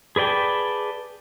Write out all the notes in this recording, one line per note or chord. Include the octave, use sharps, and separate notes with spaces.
G#4 B4 D5 G5 A5